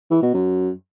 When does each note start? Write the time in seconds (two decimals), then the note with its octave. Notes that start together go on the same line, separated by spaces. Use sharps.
0.11 E3
0.22 B2
0.34 F#2